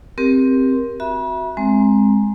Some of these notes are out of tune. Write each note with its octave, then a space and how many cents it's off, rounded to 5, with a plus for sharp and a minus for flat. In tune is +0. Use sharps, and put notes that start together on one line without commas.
C4 +0 G4 +10 A#4 +20
F#4 +0 E5 +0 B5 -40
G#3 +0 C4 +10 A#5 +5